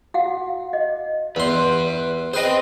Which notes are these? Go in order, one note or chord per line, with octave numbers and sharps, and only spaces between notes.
F#4 F5 F#5
D#5
E2 B4 D5 C6
G#4 B4 C5 D#5 G5